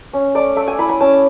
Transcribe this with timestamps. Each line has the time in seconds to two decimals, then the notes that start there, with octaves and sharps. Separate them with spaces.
0.13 C#4
0.35 A3 D5
0.56 A3 E5
0.68 G#5
0.79 E4 B5
0.89 B5
1.00 C#4 A5